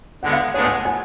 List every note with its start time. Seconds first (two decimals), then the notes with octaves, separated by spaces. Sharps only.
0.23 D3 G#3 B3 F#5
0.33 F5
0.54 A2 G#3 B3 D4 G#4 C#5
0.65 G#5
0.74 F#5
0.85 G#5